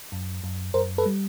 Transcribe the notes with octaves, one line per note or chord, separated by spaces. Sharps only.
F#2
F#2
F#2 A#4 C5
A4 B4
G3